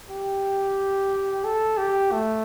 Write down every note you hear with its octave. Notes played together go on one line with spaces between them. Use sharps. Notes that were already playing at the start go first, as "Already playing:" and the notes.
G4
A4
G4
A3